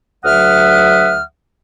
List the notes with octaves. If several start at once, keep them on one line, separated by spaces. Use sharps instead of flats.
D2 F#3 E5 F#5 D#6 F6